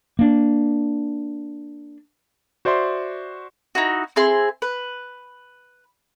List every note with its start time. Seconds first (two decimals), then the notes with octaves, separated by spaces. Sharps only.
0.19 A#3 D4
2.65 F#4 C5 D5 E5 C6
3.75 D#4 E4 F#4
4.16 C4 E4 G#4 C6
4.62 B4